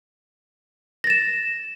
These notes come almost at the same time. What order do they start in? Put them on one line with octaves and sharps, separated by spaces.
A#6 A6 E7